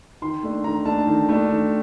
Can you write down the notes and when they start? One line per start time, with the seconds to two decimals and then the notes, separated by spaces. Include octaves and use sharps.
0.22 D#3 C6
0.43 A3 D4
0.64 D#3 A#5
0.86 A3 D4 A5
1.07 D#3
1.29 A3 D4
1.49 D#3